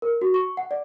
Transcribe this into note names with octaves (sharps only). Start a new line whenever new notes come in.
A#4
F#4
C#6
F#5
D5